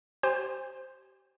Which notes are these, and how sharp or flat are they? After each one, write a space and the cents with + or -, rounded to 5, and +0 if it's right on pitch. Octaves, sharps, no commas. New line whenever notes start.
G4 -25 C5 +0 G#5 -40